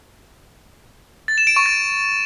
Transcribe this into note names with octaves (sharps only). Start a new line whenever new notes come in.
A6
E7
D7
C#6
A6